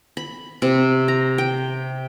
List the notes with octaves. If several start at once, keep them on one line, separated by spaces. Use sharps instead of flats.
B5
C3
A#5
G5